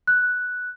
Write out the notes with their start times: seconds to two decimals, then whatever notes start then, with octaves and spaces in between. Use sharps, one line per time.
0.07 F#6